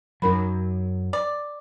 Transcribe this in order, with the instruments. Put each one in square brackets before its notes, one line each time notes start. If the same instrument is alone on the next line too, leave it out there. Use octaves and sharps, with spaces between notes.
[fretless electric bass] F#2 F#3 [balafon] D#4 A#4 B5
[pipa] D5